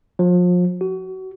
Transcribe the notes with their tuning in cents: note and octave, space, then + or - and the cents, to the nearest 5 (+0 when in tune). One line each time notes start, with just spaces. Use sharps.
F3 +35
F#4 +30